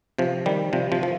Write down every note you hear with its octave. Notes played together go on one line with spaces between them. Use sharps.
C3 F3
D#3 G3
C3 F3
C3 F3
F3